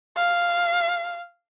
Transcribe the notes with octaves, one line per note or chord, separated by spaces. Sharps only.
F5